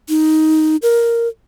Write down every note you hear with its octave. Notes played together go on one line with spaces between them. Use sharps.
D#4
A#4